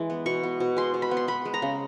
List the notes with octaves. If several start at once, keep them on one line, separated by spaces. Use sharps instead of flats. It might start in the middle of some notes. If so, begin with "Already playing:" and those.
Already playing: E3 G#3
B3
B2 C#6
B3
B2
G#3 C6
B2
B5
B3
C6
B3 B5
G#3
A#5
C#3